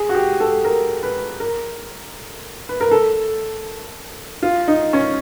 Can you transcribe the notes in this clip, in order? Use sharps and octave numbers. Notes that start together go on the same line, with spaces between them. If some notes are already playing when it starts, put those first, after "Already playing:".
Already playing: G#4
F#4
G4
A4
A#4
B4
A#4
B4
A#4
A4
F4
D#4
C#4